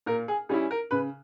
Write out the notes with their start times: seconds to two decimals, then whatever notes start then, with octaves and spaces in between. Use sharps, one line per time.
0.06 A#2 A#4
0.28 G#4
0.49 G3 C#4 E4 G#4
0.71 A#4
0.91 C#3 B4